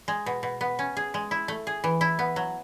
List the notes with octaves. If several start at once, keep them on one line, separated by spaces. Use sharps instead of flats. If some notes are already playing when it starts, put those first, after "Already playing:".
G#3
B2
B2
B3
C#4
G#4
G#3
E4
A3
G#4
E3
E4
B3
F#3